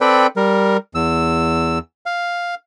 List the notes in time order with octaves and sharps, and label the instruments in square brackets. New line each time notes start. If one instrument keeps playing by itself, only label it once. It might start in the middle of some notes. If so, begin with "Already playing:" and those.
[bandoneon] C4 A4 B4 D5 G5
G3 A#4
E2 E6
F5